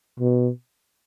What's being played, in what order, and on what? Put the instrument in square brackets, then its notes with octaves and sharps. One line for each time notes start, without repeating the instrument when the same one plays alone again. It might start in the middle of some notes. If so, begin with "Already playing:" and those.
[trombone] B2